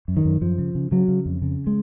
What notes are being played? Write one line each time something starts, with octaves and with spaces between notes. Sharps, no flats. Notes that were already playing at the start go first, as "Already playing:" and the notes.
F#2
D#3
F#2
F#2 F3
C#3
C#3
C#3 F#3
C#3
F2
C#3
G#3